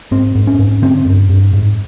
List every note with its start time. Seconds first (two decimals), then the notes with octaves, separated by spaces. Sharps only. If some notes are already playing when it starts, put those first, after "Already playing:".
0.11 G#2 C4
0.35 G#2
0.47 C#4
0.59 G#2
0.82 D3 C4
1.06 G2
1.30 G2
1.53 G#2